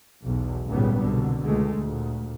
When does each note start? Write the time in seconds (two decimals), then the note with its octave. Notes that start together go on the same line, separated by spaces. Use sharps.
0.23 B1 E2
0.67 G#1 C#2 A#2 C#3 G3 B3
1.00 C2 B2 D3
1.44 C#2 G#3 A3
1.77 D2 A#2